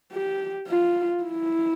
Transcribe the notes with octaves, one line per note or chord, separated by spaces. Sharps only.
G4
F4
E4